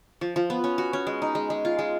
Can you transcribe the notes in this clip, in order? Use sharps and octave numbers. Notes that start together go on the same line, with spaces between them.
F3
F3
B3
C#4
F#4
C#4
G#3
D#4
G#3
G#3
F4
G#3